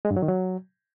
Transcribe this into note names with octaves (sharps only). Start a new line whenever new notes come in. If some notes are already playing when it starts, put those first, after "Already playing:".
G#3
G2
F#3
D#3
F#3